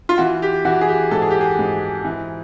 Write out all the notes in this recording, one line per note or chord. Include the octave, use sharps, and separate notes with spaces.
F4
E3 F#4
G4
E3 F#4
G#4
G4
G#2 A4
G#4
G4
G#4
G#2
E3